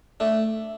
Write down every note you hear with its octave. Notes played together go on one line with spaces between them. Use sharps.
A3 D4